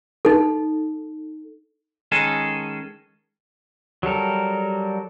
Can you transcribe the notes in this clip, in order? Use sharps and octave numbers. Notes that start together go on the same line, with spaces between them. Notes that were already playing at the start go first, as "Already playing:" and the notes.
D#4 A4
D#3 G#3 C#4 G#4 A4
F#3 G3 A4 A#4